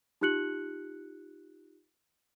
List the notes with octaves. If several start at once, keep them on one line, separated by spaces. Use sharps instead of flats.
D#4 F4 G4 F#6 C#7 F#7